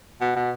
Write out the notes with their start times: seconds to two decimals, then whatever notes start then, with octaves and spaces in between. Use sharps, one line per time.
0.21 B2
0.36 B2